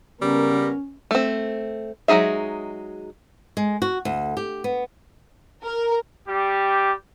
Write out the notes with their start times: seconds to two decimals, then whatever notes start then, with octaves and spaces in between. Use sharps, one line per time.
0.22 C#3 G3 B3 C#4 A#4
1.11 A3 C4
2.08 F#3 G#3 D#4 G#4 E5
3.57 G#3
3.82 F#4
4.05 D2
4.37 G4
4.64 B3
5.63 A#4
6.28 G3 G4